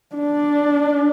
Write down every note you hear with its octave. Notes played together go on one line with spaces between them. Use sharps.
D4